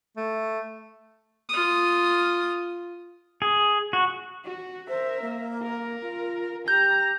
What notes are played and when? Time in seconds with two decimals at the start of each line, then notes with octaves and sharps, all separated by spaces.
0.17 A3
1.49 F4 D#6
3.42 G#4
3.93 F#4
4.45 F#4
4.88 A#4 C5 E5
5.22 A#3
5.62 A#4
6.02 F4
6.68 G4 A#5 G6